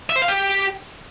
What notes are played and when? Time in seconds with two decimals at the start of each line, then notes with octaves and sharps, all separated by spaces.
0.10 E5
0.16 C5
0.22 F5
0.28 G4